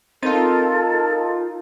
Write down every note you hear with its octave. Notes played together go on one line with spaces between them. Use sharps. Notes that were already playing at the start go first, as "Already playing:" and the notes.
C4 D#4 F4 A4 A#4 A6 D#7